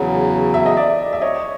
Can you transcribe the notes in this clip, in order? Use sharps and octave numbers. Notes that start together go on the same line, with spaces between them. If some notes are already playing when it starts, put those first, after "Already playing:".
Already playing: E2 C#3 F#3
E5
D#5
D5 E5
E5
C#5 D#5